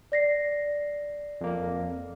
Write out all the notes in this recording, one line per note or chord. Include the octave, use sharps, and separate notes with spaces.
D5 A#6 C7
F2 A#3